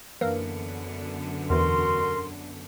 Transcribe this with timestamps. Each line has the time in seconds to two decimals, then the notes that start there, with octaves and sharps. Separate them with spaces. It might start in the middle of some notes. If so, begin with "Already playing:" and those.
0.21 F#2 D3 E3 A#3 B3 A#4
1.50 E2 B2 E3 F#4 A#4 C6